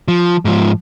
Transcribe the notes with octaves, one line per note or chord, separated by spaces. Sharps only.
F3
G#2 F3